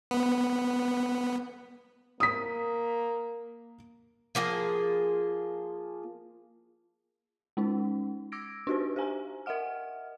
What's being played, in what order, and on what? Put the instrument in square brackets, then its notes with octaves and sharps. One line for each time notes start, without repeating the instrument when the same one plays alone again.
[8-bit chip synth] B3
[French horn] A#3 [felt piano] D#6 B6
[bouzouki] F3 A#3 F4 G#4
[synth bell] G#3 C#4 D#4
D6 E6 G#6 A#6 D7
D4 D#4 F#4 G4 B4 C5
G4 C5 F5 G#5 A#5
A#4 D#5 E5 F#5 F6